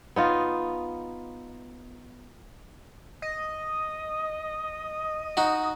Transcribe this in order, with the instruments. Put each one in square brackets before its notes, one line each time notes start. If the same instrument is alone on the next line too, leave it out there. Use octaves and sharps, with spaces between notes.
[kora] B3 D#4 F4
[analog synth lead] D#5
[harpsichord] D#4 F#4